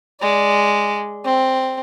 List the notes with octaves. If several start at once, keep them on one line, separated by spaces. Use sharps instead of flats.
G#3 D5
C4